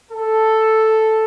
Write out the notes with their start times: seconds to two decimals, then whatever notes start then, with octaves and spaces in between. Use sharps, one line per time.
0.10 A4